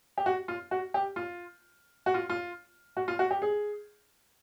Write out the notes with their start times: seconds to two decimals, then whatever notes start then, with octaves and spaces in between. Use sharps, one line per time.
0.18 G4
0.26 F#4
0.48 F4
0.71 F#4
0.94 G4
1.16 F4
2.06 F#4
2.14 F4
2.30 F4
2.97 F#4
3.08 F4
3.19 F#4
3.31 G4
3.42 G#4